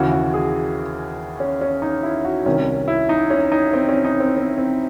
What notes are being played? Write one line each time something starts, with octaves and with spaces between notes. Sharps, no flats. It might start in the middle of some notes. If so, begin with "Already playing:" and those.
Already playing: D#2 C#3 E3 F#4
F#4
G#4
C#4
C#4
D#4
E4
F#4
C2 C3 D#3 C#4
E4
D#4
C#4
D#4
C4
C#4
D#4
C4
C4
C4